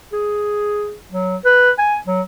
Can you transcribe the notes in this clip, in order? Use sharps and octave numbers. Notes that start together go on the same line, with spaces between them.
G#4
F#3
B4
G#5
F#3